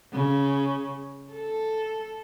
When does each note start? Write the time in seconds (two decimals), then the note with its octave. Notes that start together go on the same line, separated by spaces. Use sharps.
0.13 C#3
1.33 A4